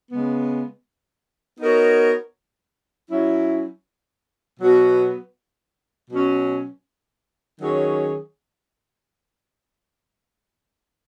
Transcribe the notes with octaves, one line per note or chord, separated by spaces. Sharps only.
C#3 G#3 B3
B3 D#4 F#4 A#4 C#5
F#3 C#4 E4
B2 F#3 B3 F#4
B2 F#3 C#4
D#3 F#3 C#4 G#4 C#5